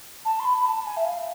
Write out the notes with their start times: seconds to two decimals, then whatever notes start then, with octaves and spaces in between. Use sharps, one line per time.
0.25 A5
0.39 C6
0.44 B5
0.57 B5
0.65 A5
0.85 G#5
0.96 E5
1.04 F5